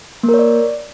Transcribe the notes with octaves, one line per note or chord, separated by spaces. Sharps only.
A#3
A#4
C#5
D5